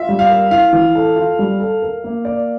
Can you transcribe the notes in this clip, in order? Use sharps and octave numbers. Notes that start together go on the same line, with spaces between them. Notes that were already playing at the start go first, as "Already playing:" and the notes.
Already playing: F4 E5
G3
F5
A#4
E4 F5
E3
A4
F4
G3
A4
A#4
A#3
D5